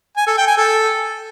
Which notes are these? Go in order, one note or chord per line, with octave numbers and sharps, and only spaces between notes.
G#5
A4
G5
G#5
A4